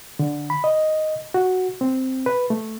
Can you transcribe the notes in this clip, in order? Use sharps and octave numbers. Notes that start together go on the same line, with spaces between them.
D3
B5
D#5
F#4
C4
B4
A3